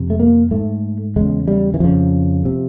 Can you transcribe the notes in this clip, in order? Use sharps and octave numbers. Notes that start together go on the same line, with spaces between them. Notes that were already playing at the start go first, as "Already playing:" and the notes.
Already playing: F2 C3
A3
A#3
G#2 A3
E2 C#3 G#3
G3
E3
F2 C#3 F3
C3